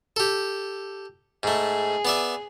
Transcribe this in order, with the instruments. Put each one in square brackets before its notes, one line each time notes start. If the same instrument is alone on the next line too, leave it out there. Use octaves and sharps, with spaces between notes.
[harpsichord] G4 A4
[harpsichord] G#2 A3 [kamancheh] G#4
[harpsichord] B3 D5 E5